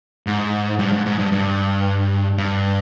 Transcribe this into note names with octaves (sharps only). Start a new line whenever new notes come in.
G#2
G2
G#2
G#2
G2
G2
G2